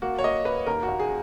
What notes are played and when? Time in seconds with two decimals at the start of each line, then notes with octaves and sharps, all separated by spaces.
0.02 A#3 F#4
0.19 C#5
0.24 A#3 D#5
0.45 A#3 B4
0.66 D#2 A#4
0.83 F#4
0.88 D#2
1.00 G#4